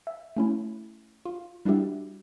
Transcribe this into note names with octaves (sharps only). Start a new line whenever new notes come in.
E5
A3 C#4 E4
F4
G3 D4 E4 F#4 G4 E5